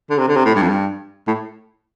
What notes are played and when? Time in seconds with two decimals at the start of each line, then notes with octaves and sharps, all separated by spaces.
0.10 D3
0.18 C3
0.28 D3
0.36 C3
0.45 A2
0.55 G2
0.62 F2
0.69 G2
1.27 A2